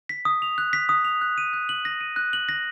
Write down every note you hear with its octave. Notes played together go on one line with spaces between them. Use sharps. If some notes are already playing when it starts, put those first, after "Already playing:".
B6
D#6
F7
F#6
B6
D#6
F7
F#6
D#7
F#6
F#7
A#6
D#7
F#6
F#7
A#6